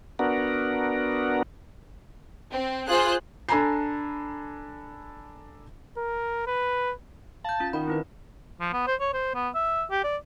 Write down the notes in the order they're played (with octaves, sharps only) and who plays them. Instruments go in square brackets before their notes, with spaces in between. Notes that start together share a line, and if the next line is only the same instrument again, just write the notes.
[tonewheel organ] B3 D4 F#4 A#4
[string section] C4
[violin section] F4 G#4 [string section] C5 F#6
[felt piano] D4 A4 G#5 A#5 B5 C7
[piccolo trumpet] A#4
B4
[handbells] F5 G6 [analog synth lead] A5
[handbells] C#4 F4
[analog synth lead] D#3 [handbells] A#4 F#5 B5
[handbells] C4 E4 B4
[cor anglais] F3
B3
C5
C#5
C5
B3
E5
G4
D5